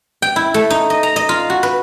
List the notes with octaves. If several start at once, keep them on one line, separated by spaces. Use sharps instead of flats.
G5
E4
A3
D#4
D#5
A#5
D#5
F4
F#4
B4